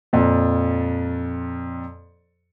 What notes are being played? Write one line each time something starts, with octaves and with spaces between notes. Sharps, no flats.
F2 A#2 F3